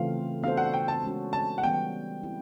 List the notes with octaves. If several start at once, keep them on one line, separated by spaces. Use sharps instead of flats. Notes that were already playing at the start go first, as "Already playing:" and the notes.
Already playing: C#3 E3 A3 C4 F4 F5
B3 D4 F#4 A4 C5 F5
F#5
G5
A5
G#3 C#4 F#4
A5
F#5
E3 G3 B3 G5
C4 E4 G4